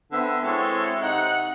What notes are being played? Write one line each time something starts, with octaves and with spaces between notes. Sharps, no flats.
D3 B3 C4 E5
G#3 C4 E4 F#4 A4 C#5
C3 D#4 F#5